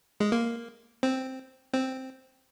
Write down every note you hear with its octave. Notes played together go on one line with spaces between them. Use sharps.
G#3
A#3
C4
C4